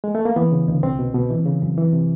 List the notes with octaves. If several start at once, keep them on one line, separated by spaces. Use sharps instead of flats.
G#3
A3
A#3
E3 B3
C#3
D2
C2 C4
B2
B2
E3
C#3
F#2
E3
C3